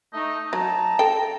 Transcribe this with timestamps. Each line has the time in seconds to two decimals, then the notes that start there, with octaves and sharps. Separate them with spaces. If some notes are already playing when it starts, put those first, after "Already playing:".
0.13 A3 D#4
0.53 F#3 A5 A#5
0.99 A4 G5